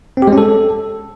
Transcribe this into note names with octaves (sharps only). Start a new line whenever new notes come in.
C4
G4
G#3
C#4
A4